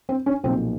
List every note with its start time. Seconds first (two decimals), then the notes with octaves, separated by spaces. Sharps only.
0.09 C4
0.26 C#4
0.43 B1 A#2 F3 C4